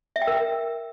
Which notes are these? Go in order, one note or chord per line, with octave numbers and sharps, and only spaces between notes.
E5
G5
A#4